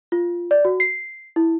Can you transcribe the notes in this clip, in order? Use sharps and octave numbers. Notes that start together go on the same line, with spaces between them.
F4
D5
F#4
C7
E4